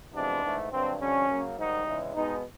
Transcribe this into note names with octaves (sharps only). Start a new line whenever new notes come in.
F2 C3 E3 G#3 B3 D4
G#2 E3 A3
G2 D3 F#3 C4
F2 D3 G3 C#4
C#3 F#3 A#3
G#2 D#3 G3 D#4
E2 C#3 E3 G#3
B2 G#3 B3 D#4